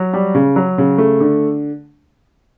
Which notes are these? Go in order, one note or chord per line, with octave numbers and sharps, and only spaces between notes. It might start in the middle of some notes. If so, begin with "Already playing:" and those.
Already playing: F#3
G3
C#3
F#3
C#3
A3
D3